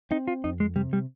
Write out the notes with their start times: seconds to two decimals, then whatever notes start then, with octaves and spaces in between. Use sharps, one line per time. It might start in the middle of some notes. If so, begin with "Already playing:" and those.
0.11 C4 D#4
0.27 F4
0.44 F2 D#4
0.60 G#3
0.76 C3 G3
0.93 G3